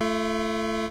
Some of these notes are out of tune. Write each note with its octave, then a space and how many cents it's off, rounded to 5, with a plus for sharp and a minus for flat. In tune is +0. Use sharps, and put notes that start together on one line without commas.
A3 +0 F4 -45